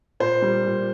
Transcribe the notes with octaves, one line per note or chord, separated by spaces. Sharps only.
A#2 C5
G3
A#2